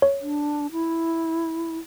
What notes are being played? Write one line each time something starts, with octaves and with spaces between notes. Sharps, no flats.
C#5
D4
E4